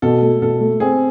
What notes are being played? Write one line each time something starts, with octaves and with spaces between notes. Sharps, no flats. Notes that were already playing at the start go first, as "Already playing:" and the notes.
B2 A4
A3
B2 A4
A3
C4 G#4